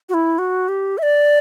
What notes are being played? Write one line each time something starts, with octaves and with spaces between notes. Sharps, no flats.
F#4
E4
F#4
G4
E5
D5